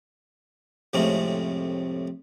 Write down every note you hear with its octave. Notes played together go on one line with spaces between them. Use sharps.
F2 A2 C3 G#3 A3 C#4